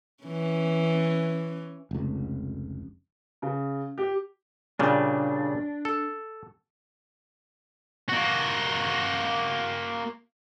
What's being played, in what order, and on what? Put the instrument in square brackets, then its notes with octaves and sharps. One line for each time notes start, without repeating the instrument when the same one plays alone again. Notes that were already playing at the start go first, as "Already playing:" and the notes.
[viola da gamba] E3 C#4
[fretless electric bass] F1 C#2
[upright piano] C#3
G4
[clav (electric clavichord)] A#2 C#3 G3 [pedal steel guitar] D4
[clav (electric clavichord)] A4
[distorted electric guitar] A#3 F#4